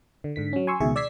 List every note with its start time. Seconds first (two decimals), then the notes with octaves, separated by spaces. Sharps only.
0.24 D3
0.36 G#2 D3 B6
0.53 F#3 C#4
0.67 G#5 C6 C#6 E6
0.80 C#2 B2 D#3 G#4 E5 C#6
0.96 D5 E6 G#6 B6 C7